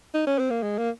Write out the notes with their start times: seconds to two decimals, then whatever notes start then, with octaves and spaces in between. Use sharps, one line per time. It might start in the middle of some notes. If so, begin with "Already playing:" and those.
0.14 D#4
0.27 C#4
0.39 C4
0.50 A#3
0.62 G#3
0.78 A#3